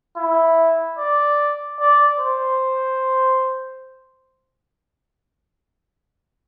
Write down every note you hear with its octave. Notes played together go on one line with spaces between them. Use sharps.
E4
D5
D5
C5